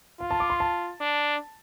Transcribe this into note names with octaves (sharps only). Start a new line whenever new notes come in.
F4 F5
A5
D6
C6
A5
D4